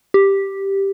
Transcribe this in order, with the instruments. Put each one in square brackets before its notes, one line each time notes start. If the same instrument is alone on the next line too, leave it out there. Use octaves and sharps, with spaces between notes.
[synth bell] G4